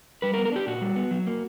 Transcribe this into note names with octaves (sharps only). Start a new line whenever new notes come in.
G3 B4
A#4
B3
A#4
D4 G4
A#2 F#4
G3
B3
F#3
A#3